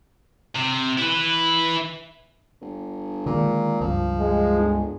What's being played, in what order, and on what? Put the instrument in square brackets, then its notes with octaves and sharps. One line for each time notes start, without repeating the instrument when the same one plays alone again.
[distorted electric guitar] C3
E4 B4
[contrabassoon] G1
[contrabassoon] A#2 [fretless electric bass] D3 D#3 G#3
[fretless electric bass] C#2 G2 [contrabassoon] F3
[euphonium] G#3
[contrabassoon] G1